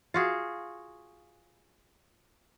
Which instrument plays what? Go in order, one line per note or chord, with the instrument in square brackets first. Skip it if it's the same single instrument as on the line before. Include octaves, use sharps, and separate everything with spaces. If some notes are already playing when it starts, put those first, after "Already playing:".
[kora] F4 F#4 G#4